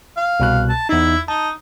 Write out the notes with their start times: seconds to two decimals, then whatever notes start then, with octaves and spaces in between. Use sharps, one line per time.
0.17 F5
0.40 C2 B2 F#6
0.69 A5
0.89 E2 D#4 E4
1.28 D#4 A5